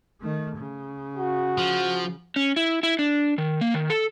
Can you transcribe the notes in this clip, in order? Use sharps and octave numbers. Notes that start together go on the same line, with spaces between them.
D#3 A3
C#3
F#4
F3
C#4
E4
E4
D4
D#3
A#3
D#3
A4